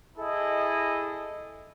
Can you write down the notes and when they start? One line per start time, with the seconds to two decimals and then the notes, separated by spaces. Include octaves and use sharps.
0.18 E4 G#4 A4 D#5